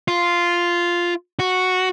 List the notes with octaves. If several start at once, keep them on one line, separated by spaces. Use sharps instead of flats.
F4
F#4